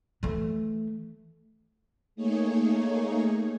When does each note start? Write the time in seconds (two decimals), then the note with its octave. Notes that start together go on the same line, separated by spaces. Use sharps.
0.23 E3 A3
2.16 A3 A#3 D#4 G#4 C#5